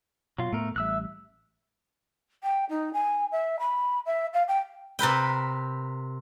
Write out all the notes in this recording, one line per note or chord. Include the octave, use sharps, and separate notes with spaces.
B2 F#3 F4
A2 A3 B3 A#4
A1 G3 E5 E6 F#6
G5
D#4
G#5
E5
B5
E5
F5
G5
C3 A#4 B4 G5